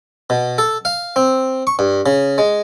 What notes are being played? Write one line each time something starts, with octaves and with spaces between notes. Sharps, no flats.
B2
A4
F5
C4
C#6
G2
C#3
G#3